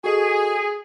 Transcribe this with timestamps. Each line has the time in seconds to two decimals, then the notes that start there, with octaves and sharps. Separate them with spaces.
0.04 F#4 G#4 A4 D#5 G#5